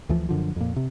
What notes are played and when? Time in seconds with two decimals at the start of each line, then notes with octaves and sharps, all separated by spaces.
0.09 D2 E3 F3
0.29 F#2 D3 F3
0.56 F2 A#2
0.76 C3